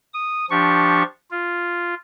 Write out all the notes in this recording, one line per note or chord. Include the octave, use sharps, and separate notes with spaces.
D#6
F3 D4 G4 C#6
F4